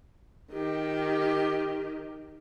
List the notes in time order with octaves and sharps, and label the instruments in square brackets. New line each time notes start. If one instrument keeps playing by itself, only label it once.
[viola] D#3 G4